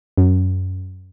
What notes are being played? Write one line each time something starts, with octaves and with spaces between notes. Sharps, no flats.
F#2